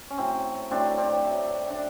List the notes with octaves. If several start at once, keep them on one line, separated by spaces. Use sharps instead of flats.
C#4
A2 F#3 A3 C4
A2 F#3 A3 C4 D4
C4 D4
A2 F#3 A3
D4